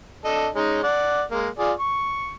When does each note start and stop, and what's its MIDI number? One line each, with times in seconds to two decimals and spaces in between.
0.25 0.48 62
0.25 0.48 69
0.25 0.48 75
0.55 0.82 56
0.55 0.82 61
0.55 0.82 63
0.83 1.23 74
0.83 1.23 78
1.31 1.48 56
1.31 1.48 58
1.59 1.73 65
1.59 1.73 68
1.59 1.73 74
1.79 2.34 85